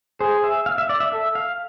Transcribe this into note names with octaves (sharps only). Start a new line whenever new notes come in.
G#4 C5
E5
F5
E5
D5
E5
A4 E5
F5